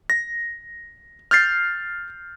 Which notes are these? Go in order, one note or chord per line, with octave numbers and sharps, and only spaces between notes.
A#6
F6 G6 A6 C7